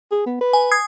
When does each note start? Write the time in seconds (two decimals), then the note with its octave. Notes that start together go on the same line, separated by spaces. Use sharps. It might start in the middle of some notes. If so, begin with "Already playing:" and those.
0.12 G#4
0.26 B3
0.41 B4
0.53 G#5
0.71 D#6 G#6 C7